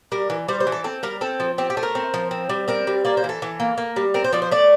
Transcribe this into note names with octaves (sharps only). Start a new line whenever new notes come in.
G3 A#4
E3
G3 C5
C5
E3
A4
C4 A4
G3 A#4
C4 A4
F3
C4 G4
G4
A3
A#4
C4
F3
C4
G3
C4 A#4
G3
A#3 D5
C5
E3
A4
E3
A#3
A#3
G3
C4 A#4
C5
F3 D5
C5
A3 D5